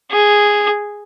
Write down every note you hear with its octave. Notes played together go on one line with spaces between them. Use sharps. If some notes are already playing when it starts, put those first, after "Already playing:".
G#4